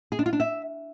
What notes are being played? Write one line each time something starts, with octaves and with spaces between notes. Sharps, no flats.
G#4
D4
F4
D4
E5